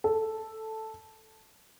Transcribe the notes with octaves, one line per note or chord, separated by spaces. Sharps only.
A4